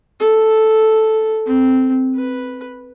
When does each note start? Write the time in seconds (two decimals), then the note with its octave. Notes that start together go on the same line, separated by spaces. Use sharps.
0.20 A4
1.46 C4
2.16 B4